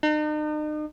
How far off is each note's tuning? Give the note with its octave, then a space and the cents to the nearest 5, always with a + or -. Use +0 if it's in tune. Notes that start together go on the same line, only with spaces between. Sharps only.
D#4 -40